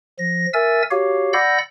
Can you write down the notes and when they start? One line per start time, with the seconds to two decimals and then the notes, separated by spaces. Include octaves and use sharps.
0.19 F3 A#6
0.53 A#4 E5 G#5 E6 A6
0.91 F#4 G4 C#5 F5
1.33 D5 F#5 B5 E6 G6 A#6